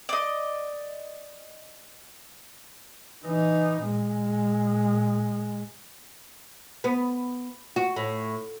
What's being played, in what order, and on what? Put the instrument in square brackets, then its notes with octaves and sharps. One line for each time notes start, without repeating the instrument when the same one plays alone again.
[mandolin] D5 D#5
[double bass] E3 D#4
A#2 G#3
[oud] B3
F#4
A2